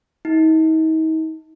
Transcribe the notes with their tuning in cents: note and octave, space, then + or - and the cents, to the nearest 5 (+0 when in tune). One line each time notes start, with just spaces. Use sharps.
D#4 +40